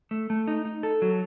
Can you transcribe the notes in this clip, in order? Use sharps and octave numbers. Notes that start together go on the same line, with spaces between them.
A3
A3
D#4
D#4
A4
F#3